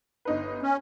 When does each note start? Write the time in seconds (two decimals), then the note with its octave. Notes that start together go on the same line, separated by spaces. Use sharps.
0.25 G1 D#4 B4
0.62 C#4